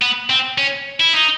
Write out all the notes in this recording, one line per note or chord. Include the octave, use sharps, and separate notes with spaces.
B3
C4
C#4
E4
D#4